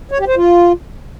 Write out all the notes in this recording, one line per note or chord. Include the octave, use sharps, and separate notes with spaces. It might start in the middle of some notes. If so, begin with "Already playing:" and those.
C#5
G4
C5
F4